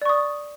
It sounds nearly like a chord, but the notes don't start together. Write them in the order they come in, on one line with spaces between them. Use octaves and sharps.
D5 C#6 D#6